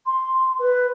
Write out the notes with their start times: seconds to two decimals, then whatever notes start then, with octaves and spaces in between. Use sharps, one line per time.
0.06 C6
0.59 B4